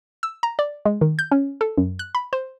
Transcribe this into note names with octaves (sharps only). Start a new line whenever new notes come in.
E6
A#5
D5
G#3
D#3
G6
C#4
A4
F#2
F#6
B5
C5